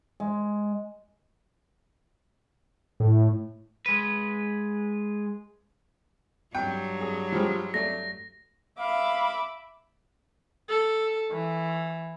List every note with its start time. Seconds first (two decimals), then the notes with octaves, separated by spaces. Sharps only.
0.20 G#3
3.00 A2
3.86 G#3 B4
6.55 G2 F#3 G5
7.01 G#4
7.32 F3 G3 G#3
7.74 A3 D5 A#6
8.80 E5 F5 B5 D6
10.70 A4
11.32 E3